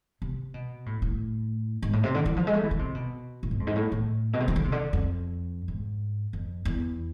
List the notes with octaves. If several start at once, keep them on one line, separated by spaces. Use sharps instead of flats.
C3
B2
A2
A2
G#2
A2
C3
D3
E3
F3
G#3
A3
E3
D3
C3
B2
A2
G#2
F2
G#2
A2
A2
B2
C3
E3
D3
C3
D3
F2
G#2
F2
E2